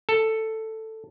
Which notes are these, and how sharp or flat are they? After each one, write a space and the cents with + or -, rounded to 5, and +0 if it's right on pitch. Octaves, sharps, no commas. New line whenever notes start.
A4 +5